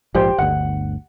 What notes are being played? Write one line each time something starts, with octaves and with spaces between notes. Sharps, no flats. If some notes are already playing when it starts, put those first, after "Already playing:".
A#1 G#2 F3 G4 C5 G5
G1 D2 F#5